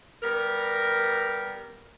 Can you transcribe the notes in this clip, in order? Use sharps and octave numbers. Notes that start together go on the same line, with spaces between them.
G3 B3 A#4